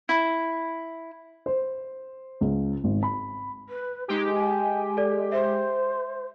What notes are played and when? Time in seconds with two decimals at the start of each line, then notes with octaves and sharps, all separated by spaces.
0.09 E4
1.46 C5
2.41 C#2
2.84 G#1
3.03 B5
3.69 B4
4.08 G#3 D#4 G4
4.34 G#5
4.97 A4 D5
5.32 C5 E5